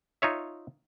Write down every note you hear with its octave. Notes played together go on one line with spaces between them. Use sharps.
D#4 F4 C#5 E5